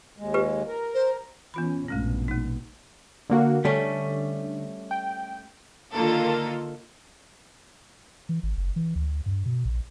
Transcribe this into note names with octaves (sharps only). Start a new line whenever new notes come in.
D#2 G#3
F4 G4 B4
A#4
C5
E3 B3 C#4 F4 B5
A#1 G2 B2 G#3 A3 C#4
A#3 D#4
D3 A#3 F#4
D3 G3 A3 C#4
G5
D3 D#3 A#3 F4 A4 A#4
E3
G#1
F#1
E3
D2
G2
B2
A#1